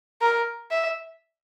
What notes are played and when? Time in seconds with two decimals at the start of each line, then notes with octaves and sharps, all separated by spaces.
0.21 A#4
0.71 E5